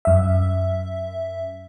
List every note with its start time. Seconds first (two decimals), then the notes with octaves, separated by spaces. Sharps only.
0.05 F#2 E5